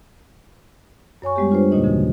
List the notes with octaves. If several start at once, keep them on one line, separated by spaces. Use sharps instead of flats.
F#2 C#5 G#5 C#6
G3 G#3 B3 G4
D4 F4 B4 C5
D#2 A#2 D3 A#3 D#4 D#5
C#3 E3 F#4